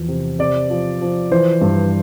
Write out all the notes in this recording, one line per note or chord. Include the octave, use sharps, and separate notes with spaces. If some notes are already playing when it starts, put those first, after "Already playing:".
Already playing: E2 F3
C3
C3 D5
F3
F3
E3 C5
G2